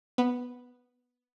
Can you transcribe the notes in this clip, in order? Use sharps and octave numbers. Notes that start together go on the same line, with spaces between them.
B3